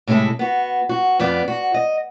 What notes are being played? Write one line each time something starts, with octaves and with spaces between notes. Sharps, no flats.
A2 C3 G#3 E4 A4
B3 F#4
F#4
F2 B3 D5
F#4
D#5